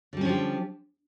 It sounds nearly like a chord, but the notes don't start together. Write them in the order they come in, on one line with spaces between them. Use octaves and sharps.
D3 G3 C#4 F3 G4